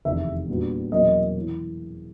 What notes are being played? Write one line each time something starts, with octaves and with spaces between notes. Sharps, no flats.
F1 E2 C3 D#3 E5
A#2 G3 B3 D4 F#4
E2 B2 F#3 A#3 C#4 D#5
E3